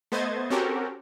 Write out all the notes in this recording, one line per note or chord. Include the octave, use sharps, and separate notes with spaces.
A3 B3 C5 D#5 G#6 A6
C4 C#4 F#4 G4 A4 A#4